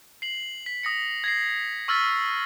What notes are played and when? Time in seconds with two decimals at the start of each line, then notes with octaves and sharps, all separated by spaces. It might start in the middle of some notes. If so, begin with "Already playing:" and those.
0.22 C7 F#7
0.66 B6
0.83 D#6 A#6 C#7
1.24 G#6 A#6 C7
1.88 C#6 E6 F6 A6 B6